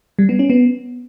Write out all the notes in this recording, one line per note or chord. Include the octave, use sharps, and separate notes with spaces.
G3
B3
C#4
B3